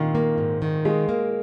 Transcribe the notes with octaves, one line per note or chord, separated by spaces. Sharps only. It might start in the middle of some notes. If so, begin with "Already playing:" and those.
Already playing: A#2 D#3 F4
A#3
G#2
D#3
G#3 F4
A#3